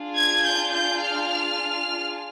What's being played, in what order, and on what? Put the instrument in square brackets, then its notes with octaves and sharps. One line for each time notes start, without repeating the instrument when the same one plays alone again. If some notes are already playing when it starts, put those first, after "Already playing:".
Already playing: [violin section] D4 F4 G#4
G#6
G6
G6
F6